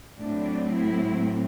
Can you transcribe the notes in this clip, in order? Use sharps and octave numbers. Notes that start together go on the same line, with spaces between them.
A2 F#3 A3 C4 D4
E4